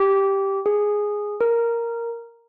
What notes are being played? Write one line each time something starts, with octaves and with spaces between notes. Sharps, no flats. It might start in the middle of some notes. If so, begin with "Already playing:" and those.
Already playing: G4
G#4
A#4